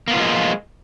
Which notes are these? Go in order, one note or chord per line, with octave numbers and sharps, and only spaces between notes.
F3 G#3 A#3 B3 F4